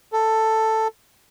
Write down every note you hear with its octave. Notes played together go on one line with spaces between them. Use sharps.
A4